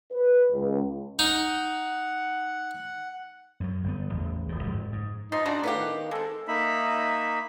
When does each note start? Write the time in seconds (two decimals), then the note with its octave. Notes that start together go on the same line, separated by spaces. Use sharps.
0.12 B4
0.52 C#2
1.19 D#4 F#5
3.60 F#2 F#3
3.84 G1 G3 B3
4.10 A1 E2
4.49 D#1 A#2
4.63 G1 G#2 F3
4.92 G#2
5.32 F3 D#4 C6
5.46 C#3 D4 F4 F#4 A5 A#5
5.63 A2 B3 G4 B4 F5 F#5
5.76 D#3
6.11 G#3 C4 A4
6.48 A#3 D#4 E5 B5